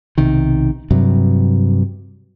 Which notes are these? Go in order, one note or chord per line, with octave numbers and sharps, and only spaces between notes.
B1 C3 D#3
G2 C3 F#3